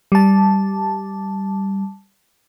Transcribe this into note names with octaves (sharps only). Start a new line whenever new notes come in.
G3 A5